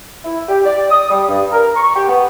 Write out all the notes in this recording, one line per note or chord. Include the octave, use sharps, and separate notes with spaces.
E4
G4
D5
D#6
G3
G2
A#4
C#6
G4
B3